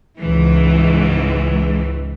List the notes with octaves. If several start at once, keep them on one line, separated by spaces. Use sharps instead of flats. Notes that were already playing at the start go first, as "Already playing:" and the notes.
C#2 G#2 E3